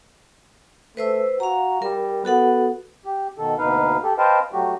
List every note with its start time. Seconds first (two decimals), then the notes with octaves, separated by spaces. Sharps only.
0.97 A3 B4 C5 E6
1.40 F#4 F5 A#5
1.82 G3 A#4
2.25 B3 F#4 A4 F#5
3.05 G4
3.38 B2 D#3 A4
3.58 D2 B2 A#3 D#4 B4 F5
4.03 G4 A4
4.18 B4 C5 D#5 F5 G5 A5
4.53 F#3 G3 A3 F#4 G4